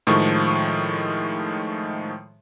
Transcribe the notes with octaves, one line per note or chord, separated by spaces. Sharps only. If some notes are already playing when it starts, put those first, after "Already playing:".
A2 D#3 F3 G#3 C#6